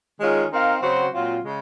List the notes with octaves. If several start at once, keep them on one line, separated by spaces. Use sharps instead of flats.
D#3 G#3 C#4 F4 G#4
C4 D#4 A#4 F5
C#3 F#3 C4 F#4 C5
A#2 F#3 C4 F4
C#3 G#3